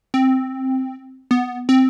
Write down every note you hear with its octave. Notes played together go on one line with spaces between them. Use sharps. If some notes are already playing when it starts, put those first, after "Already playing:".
C4
B3
C4